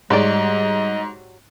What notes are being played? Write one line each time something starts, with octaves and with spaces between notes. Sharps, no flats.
G#2 F#3 G3 G4 D5 D#5